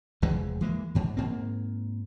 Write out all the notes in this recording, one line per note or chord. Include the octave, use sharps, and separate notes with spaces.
F1 E2 E3 G#3
E3 G#3 A#3
G#2 E3
G#2 A#3 C4